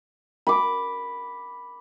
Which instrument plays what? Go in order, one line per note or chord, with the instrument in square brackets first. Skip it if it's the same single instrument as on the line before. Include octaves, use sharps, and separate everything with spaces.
[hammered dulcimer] B5 D6